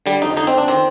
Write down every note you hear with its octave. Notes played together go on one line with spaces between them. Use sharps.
D3 G3
F2 D#4
D3 D#4
C4
F2 D4
D#3 C4